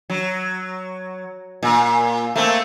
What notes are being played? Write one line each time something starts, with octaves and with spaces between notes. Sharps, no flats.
F#3
A#2
A3 A#3 C4